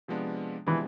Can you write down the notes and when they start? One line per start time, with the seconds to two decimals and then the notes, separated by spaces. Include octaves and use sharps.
0.08 C3 F3 G#3 B3 D4
0.66 C3 E3 F3 G#3 B3 D4